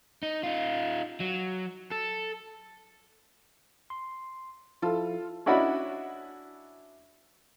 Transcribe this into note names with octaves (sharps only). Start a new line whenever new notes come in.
D#4
D#4 F4
F#3
A4
C6
F3 E4 F4 A4
C#4 D4 E4 F#4 D#5 B5